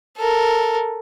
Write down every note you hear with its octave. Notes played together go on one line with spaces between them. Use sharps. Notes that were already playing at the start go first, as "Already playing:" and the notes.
A4 A#4